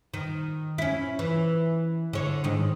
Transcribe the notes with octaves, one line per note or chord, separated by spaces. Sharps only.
D#3
C#4 E4
E3
D3 C#5
G#2 D#3